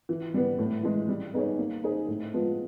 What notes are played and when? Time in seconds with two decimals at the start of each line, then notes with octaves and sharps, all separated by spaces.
0.09 E3
0.34 G3 B3
0.58 A2
0.83 E3 G#3
1.08 G3
1.33 B3 D#4 G#4 C#5
1.58 A#3
1.84 D#4 G#4 C5
2.08 A2
2.33 F3 G#3 B3